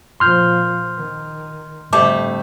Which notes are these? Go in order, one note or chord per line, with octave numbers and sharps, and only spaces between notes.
A#2 F3 C6 F6 G6
D#3
F2 A2 D3 G3 A3 E5 A5 D6